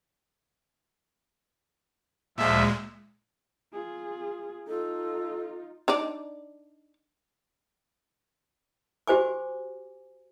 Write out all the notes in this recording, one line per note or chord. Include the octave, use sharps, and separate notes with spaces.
D2 A#2 F3 G#3 E5
F4 G#4
D#4 F4 A4
D4 D#4 D5
F#4 G4 C5 G#5 D6